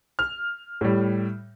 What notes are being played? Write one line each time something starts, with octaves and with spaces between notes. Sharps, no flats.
F6
A2 G3